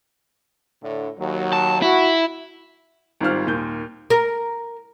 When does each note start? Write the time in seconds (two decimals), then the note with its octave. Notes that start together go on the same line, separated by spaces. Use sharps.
0.83 A2 D3
1.18 D#2 F#3
1.53 A5
1.82 E4 F#4
3.20 G#1 G#2 G3 F4 C5 F6
3.47 D#2 A#2 G6
4.10 A#4